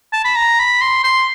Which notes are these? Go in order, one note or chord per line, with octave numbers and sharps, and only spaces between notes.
A5
B5
A#5
B5
C6
C6